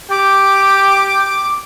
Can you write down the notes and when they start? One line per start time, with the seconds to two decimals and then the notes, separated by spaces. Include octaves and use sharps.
0.11 G4 D6